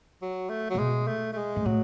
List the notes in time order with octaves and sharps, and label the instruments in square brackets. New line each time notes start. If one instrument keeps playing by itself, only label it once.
[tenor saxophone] F#3
A3
[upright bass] A2 [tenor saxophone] F#3
[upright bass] B2 [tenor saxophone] G#3
[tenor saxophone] A3
A3
G#3
[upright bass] G#2
[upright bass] A2 [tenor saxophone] F#3